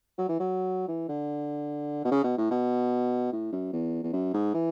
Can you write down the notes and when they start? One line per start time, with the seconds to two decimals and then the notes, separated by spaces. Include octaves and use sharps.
0.18 F#3
0.29 E3
0.40 F#3
0.88 E3
1.09 D3
2.05 B2
2.11 C#3
2.24 B2
2.37 A2
2.51 B2
3.32 A2
3.53 F#2
3.73 E2
4.03 E2
4.13 F#2
4.33 G#2
4.54 E3